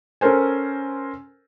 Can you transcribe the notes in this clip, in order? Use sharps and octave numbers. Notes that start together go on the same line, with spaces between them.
C#4 A4 A#4 C5 G#5